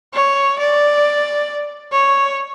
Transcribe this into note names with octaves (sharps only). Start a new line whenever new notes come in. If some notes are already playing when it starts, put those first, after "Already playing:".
C#5
D5
C#5